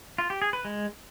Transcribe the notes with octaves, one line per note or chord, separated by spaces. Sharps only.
F4
G4
G#4
B4
G#3